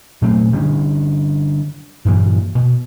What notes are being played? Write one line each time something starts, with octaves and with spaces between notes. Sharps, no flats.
A#2 F#3 A3 C4
D3 G3 C#4
G2 A#2 E3 G3
B2